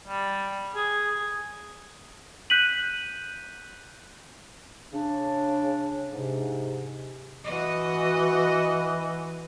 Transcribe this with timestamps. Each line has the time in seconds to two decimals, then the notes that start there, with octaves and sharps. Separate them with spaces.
0.08 G3
0.76 G#4
2.50 F#6 G6 B6 D#7 F#7
4.92 C#3 D4
6.12 G#2 C3
7.45 E3 F#4 D#5